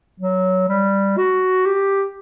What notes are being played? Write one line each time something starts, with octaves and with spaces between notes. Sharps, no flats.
F#3
G3
F#4
G4